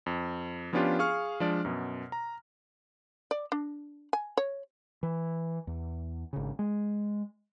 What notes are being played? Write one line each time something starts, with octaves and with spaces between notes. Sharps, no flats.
F2
F3 B3 C#4 D4 F4 G4
G#4 F5 C#6 F6
F3 G#3 D4 D5
F#2 B2
A#5
D5
D4
G#5
C#5
E3
E2
G#1 C#3
G#3